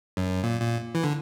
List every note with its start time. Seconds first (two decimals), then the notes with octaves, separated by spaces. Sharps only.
0.17 F#2
0.44 A#2
0.61 A#2
0.95 E3
1.04 D3